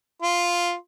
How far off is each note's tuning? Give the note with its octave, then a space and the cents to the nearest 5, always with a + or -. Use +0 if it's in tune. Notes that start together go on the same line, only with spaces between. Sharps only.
F4 +0 C6 +0